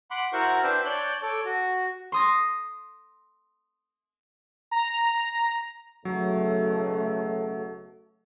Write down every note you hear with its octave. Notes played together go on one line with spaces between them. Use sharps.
F#5 B5 C6 D6
E4 F#4 A#4 C5 F#5 C#6
D4 B4 C5 E5 G5
C#5 D5 A5 F#6 G6
A4 C#5 D6
F#4
C6 D#6 A#6
A#5
B1 C#3 F#3 A3